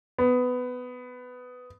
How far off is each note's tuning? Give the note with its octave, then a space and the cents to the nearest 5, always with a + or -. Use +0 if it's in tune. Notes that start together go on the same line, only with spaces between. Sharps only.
B3 +15